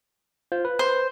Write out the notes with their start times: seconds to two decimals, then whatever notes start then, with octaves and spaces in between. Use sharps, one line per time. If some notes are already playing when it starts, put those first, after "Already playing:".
0.52 F4 C5
0.65 B4
0.79 C5